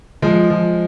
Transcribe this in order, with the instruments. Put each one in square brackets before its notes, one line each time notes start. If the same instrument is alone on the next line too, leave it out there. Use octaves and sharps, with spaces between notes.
[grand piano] F3 G#3
F3